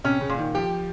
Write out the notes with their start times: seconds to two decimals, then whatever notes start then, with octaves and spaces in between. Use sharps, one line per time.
0.04 C3 C#4
0.21 C#3
0.29 A#2
0.38 D#3
0.55 F3 G4